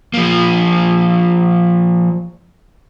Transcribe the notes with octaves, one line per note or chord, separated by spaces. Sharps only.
F3 A#3